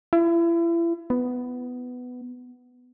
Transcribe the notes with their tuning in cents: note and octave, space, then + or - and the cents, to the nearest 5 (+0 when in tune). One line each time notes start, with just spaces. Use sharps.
E4 +35
B3 +10